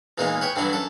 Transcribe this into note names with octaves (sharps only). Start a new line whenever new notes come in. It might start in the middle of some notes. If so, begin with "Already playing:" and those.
E2 A#2 E3 G#3 A#3 D#4
B4 C#5 G5
G2 D3 E3 F#3 D4 E4
F#2 A4